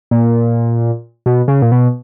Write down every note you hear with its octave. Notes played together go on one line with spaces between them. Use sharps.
A#2
B2
C#3
A#2
B2